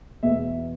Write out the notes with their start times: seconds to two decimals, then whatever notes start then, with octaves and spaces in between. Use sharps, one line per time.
0.23 E2 B2 B3 E5